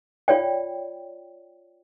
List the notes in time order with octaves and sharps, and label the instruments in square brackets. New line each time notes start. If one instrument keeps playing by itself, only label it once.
[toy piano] F4 C#5 D5 G5